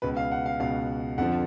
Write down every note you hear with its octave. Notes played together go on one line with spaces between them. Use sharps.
C#2 B2 B4
F5
F#5
F5
C#2 B2 F5
F2 D3 F3 F#5